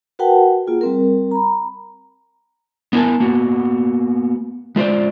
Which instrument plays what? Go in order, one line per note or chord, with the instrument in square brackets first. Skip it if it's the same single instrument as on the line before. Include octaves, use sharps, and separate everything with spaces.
[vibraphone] F#4 A#4 B4 F#5 G5 A5
A#3 F4 G#4
G3 C4 A#4
A#5 B5
[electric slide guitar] B3 D4 E4 A#4 G#5 A5
A#3 B3 F#4
G#3 F4 C5 D5